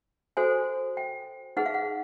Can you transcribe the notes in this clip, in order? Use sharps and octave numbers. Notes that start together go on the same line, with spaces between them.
F#4 A4 C5 G#5
G5
D#4 G#4 B4 F#5
F5
F#5